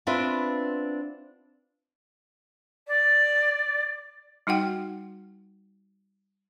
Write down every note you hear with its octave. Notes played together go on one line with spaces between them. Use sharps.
B3 C4 D4 F4 B4 E5
D5
G3 D#4 F#4 F#5 G5